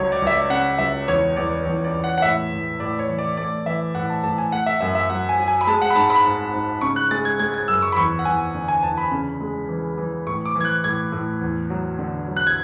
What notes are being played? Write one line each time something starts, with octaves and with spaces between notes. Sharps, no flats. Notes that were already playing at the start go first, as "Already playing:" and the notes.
Already playing: C#2 F#3 C#5
D5
C#2
E5
D5
C#3 F#5
C#2 E5
E2 C#5
E2 D5
E2
D5
E2
F#5
F#5
A2 E5
A2
A2 D5
C#5
E3
D5
A3 D5
E3 E5
A2 F#5
A5
A2 A5
G#5
A3 F#5
E5
F#2 E5
E5
F#3 F#5
G#5
F#3
G#5
B5
G#3 A5
F#5
B5
G#2 A5
B5
G#2
G#2
C#3 C#6
F#6
G#3 A6
G#6
G#3 G#6
G#6
F#2 E6
C#6
B5
E2 C#6
F#5
E2 G#5
D3
G#5
E2 A5
B5
C#3
G#3
E3
E3
A2 C#6
D6
E3
G#6
F#6
A2 G#6
A2
E2
F#3
D3
F#3
F#6
G#6